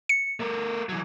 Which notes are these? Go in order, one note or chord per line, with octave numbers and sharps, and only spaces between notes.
C#7
A3 A#4
E3 F#3